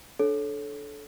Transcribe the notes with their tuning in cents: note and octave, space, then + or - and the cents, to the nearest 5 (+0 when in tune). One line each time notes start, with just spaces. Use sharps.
D4 +0 A4 -20 C#5 +0